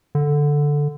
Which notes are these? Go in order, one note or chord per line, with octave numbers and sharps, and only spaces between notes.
D3